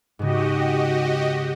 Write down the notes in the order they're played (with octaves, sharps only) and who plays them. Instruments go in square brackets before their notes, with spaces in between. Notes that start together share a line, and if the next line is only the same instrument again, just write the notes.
[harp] G#2 C#3 [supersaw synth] F#4 G4 D#5